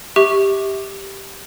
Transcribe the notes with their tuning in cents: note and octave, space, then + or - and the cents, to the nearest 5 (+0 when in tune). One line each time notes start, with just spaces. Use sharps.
G4 +0 E5 -30 C#6 +0